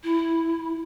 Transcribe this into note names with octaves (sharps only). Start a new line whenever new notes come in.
E4